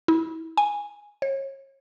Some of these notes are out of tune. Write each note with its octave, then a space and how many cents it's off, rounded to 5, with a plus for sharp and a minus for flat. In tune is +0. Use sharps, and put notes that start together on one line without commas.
E4 -30
G#5 -10
C#5 -35